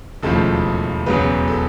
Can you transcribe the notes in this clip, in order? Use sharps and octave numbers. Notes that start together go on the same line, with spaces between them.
E1 D#2 C#3 F3 A3 A4
E1 E2 C#3 F#3 B4
A4